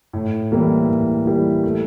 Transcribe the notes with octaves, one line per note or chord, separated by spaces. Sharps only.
A2
E3 G3 A#3 E4
A2
E3 G3 A#3 E4
A3